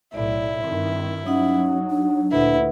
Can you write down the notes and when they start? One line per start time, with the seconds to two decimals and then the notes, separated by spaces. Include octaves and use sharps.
0.14 B1 A2 E4 D5
0.63 G2 D#3 C4
1.27 F#3 C#4 D#4 D#5 F#5
1.90 D4
2.31 D2 A#2 E4 B4 F#5